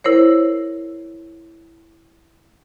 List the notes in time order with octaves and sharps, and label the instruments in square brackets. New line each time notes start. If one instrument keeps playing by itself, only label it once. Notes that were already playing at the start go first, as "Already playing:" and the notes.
[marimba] E4 A#4 C5 C#5